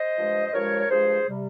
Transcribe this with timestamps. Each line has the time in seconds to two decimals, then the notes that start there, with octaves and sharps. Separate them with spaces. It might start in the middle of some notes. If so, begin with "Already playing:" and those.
Already playing: C5 D#5
0.17 G2 F3 G#3
0.46 D#5
0.54 G2 F3 G#3 A#4 C#5
0.80 C#5
0.90 G2 F3 G#3 G#4 C5
1.28 C3 G3